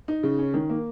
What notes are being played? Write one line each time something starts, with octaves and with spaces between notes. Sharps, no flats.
D#4
C#3
C#4
D#3
A#3